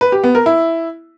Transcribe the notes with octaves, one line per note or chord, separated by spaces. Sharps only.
B4
G4
B3
A#4
E4